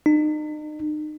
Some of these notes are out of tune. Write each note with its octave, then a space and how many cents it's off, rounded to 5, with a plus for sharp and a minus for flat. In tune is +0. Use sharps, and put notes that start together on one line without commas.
D#4 -40